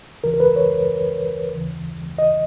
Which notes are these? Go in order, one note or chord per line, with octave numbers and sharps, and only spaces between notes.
D#2 C#3 E3 A#4
A#4
B4
C#5
D#2 C#3 E3
D#5